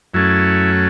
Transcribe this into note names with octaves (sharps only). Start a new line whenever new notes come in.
F#2 F#3 A3 C#4 E4